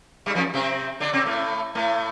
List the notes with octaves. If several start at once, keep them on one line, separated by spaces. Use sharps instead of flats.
G2 G3
F2 F3
C3 C4
D3 D4
C3 C4
A2 A3
A2 A3